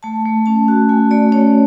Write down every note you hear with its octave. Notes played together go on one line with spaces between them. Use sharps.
A3 A5
A3
C#4 A5
F#4
A3 G#5
A3 D5
C#4 C#5